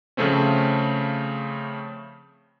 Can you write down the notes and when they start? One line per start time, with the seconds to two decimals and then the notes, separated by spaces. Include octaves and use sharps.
0.17 C#3 F3 A3 C4 C#4